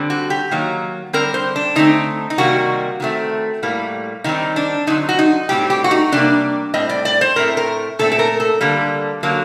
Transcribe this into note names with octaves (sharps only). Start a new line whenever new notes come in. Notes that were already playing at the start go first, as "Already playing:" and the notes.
Already playing: D3 G3 C4
F#4
G4
D#3 F#3 A#3
D3 G3 C4 A#4
C5
D4
D3 A3 C4 D#4
D#4
C3 D#3 G3 A#3 F#4
D#3 F#3 A3 C4
A2 G3 A#3
D#3 G3 C4 D#4
D4
D3 F#3 C4 D#4
F#4
D#4
A2 G3 C4 G4
G4
F#4
D#4
C3 G3 A#3 D4
A2 G3 C4 D#5
D5
D5
C5
A2 A3 C4 A#4
A#4
A#2 A3 C4 A4
A4
A#4
A4
D3 G3 A#3
D3 F#3 A#3